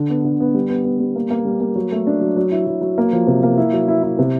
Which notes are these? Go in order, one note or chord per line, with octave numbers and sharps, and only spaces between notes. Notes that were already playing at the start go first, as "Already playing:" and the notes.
Already playing: D3
B3
D3
B3
G3
B3
B3
G3
A#3
A#3
G3
A#3
F#3
A3
D4
F#3
F#3
E4
F#3
F#3
A#3
F3
C3
A#3
E4
F#3
E4
E4
C3